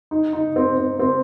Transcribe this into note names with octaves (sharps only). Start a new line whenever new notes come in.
D#4
D#4
C4
C4
C4